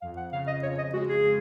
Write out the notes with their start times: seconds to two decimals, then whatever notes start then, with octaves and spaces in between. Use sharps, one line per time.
0.02 F2 F5
0.17 F#5
0.32 C#3 F5
0.47 D#5
0.62 F2 C#5
0.78 D#5
0.93 G#3 F#4
1.08 G#4
1.24 C#3